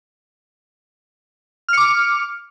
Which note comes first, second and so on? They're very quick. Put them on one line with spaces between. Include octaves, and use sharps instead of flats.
F6 C#7 D6